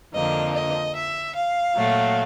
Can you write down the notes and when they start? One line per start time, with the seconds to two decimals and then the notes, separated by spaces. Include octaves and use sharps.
0.14 F2 D3 F3 A#3 D#5
0.54 D#5
0.94 E5
1.35 F5
1.76 A#2 F#3 A3